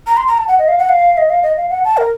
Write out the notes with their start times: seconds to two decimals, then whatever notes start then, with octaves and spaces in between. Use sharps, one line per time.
0.07 A#5
0.17 C6
0.27 A#5
0.38 A5
0.48 F#5
0.59 D#5
0.68 F5
0.79 F#5
0.89 F5
1.18 D#5
1.30 F5
1.43 D#5
1.57 F5
1.70 F#5
1.85 A5
1.97 A#4